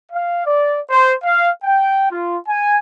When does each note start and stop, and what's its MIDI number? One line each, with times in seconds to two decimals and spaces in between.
0.12 0.42 77
0.46 0.78 74
0.89 1.13 72
1.24 1.50 77
1.64 2.10 79
2.11 2.37 65
2.48 2.77 80